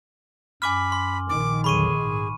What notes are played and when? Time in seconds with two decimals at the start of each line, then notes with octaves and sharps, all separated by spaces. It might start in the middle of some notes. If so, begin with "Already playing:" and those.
0.62 F#2 G#5 B5 D6 F6
0.92 C6
1.29 A#1 D#3 D6
1.64 E2 D3 F#3 G#4 B5 C#6 D#7
2.00 G#2